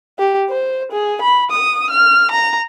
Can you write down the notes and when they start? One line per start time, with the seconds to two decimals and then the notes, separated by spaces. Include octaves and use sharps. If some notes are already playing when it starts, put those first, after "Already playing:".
0.18 G4
0.50 C5
0.91 G#4
1.21 B5
1.51 D#6
1.90 F6
2.31 A#5